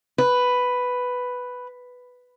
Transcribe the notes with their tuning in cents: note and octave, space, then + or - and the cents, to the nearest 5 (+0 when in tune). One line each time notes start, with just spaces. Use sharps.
B4 +5